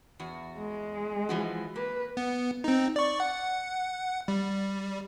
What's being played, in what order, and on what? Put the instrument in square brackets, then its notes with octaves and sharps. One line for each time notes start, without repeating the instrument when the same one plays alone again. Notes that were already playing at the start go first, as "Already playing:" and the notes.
[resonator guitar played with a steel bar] E2 F#4
[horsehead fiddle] G#3
[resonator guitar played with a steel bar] E3 F3 F#4
[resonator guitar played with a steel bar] A#3 [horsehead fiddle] B4
[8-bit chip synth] B3
C4 D#4
D5 C#6
F#5
G3